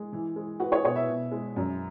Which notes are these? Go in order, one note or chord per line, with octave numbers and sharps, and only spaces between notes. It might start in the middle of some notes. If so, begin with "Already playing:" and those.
Already playing: G#3
E3
G#3
G#3 F#4 B4
G#4 C#5
B2 G#4 C#5
B4 E5
B2
G#3
F#2